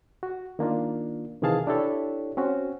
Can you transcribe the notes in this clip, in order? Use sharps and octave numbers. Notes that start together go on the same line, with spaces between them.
F#4
D#3 A#3 D4 F4
C3 D#3 E3 G#4 F5 A5
D4 E4 G4 A4 C#5
C4 C#4 F#4